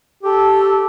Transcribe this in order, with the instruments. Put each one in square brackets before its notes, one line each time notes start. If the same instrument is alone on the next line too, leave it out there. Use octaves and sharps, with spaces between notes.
[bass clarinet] G4 [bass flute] A4